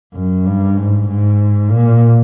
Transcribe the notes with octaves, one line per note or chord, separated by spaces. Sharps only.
F#2
G2
G#2
G#2
A#2